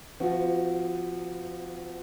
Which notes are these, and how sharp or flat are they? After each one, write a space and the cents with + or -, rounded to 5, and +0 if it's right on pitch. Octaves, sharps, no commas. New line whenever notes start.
F3 -5 C4 -45 F#4 +0